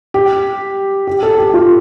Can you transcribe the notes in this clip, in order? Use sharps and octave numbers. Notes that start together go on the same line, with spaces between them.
G4
G4
A4
G4
F4